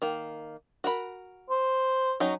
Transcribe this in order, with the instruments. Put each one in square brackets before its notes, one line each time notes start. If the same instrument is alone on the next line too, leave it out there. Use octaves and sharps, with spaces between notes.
[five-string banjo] D#3 A#3
F#4 A#4 B5
[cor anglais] C5
[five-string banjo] F#3 C#4 D#4